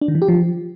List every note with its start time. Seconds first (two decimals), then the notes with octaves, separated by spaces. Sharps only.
0.01 D4
0.08 D#3
0.15 E3
0.22 G4
0.28 F3